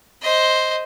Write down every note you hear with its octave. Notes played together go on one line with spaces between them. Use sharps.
C5 D#5